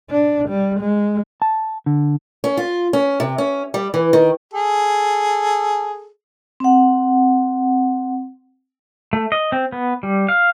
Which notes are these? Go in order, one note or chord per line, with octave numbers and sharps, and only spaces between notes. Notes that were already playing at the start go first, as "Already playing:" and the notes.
D4
G3
G#3
A5
D3
C#4
F4
C#4
C3
C#4
G3
E3
D#3
G#4 A4
C4 F#5
A3
D#5
C4
B3
G3
F5